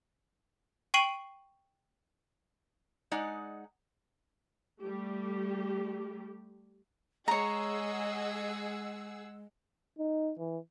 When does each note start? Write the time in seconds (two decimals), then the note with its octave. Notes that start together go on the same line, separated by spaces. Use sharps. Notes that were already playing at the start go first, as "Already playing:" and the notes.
0.94 G5 C#6 C7 D#7 F#7
3.11 G#3 D#4 D5 F#5
4.81 G3 A3 G4
7.28 G#3 G#4 C#5 D#5 F#5 A#5 E6
9.98 D#4
10.38 E3